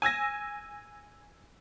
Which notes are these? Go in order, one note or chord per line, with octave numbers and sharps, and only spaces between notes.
G#5 E6 G#6 A#6